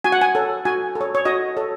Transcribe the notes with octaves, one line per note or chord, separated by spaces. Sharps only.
F#4 G#5
F#5
G#5
A4 C#5
F#4 G#5
A4
C#5
C#5
F#4 D#5
A4 C#5